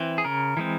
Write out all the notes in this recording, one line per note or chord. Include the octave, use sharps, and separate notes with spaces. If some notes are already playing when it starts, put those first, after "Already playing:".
Already playing: E3 C4
G#4
C#3 A#4
E3 G#3 C4